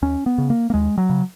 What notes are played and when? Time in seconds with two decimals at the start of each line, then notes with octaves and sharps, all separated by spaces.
0.02 D#2 C#4
0.26 B3
0.38 C#3
0.50 A#3
0.70 A#3
0.74 D#2 G#3
0.98 F#3
1.10 C#3